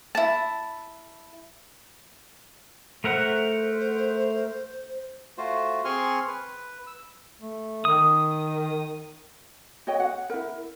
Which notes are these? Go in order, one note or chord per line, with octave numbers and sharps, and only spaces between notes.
E4 A5
A3 A#4 C5 F#5
A3 F4 F#4 C5
C4 G#4 G#5 C6 C#6 F6
B4
E6
A3
D#3 D#6
F#4 C#5 D#5 G5
F#5
E4 A#4